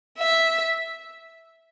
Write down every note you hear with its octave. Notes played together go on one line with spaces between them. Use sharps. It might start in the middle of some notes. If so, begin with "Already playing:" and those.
E5